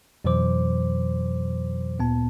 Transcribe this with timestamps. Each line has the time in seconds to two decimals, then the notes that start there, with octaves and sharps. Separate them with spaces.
0.24 F2 B2 E3 F#3 C5 D6
1.99 D2 A#2 B3 A5